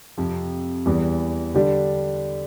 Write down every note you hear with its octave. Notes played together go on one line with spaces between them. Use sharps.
F2 C3 F3
E2 E3 G3
D3 G3 D4 G4